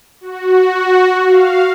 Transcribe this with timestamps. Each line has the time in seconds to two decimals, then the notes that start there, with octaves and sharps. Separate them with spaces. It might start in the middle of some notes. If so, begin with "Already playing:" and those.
0.21 F#4
1.27 F5